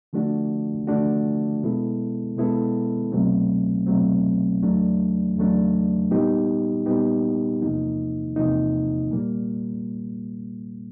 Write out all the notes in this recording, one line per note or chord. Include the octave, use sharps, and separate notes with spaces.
D3 F3 A3 D4 F#4
D3 F3 A3 D4 F#4
B2 G#3 B3 E4 A4
B2 G#3 B3 E4 A4
C2 B2 F#3 A3 C4
C2 B2 F#3 A3 C4
E2 C#3 F#3 A3 D4
E2 C#3 F#3 A3 D4
A#2 G3 B3 D#4 G4
A#2 G3 B3 D#4 G4
E2 C3 F3 A#3 D#4
E2 C3 F3 A#3 D#4
A#2 G3 A#3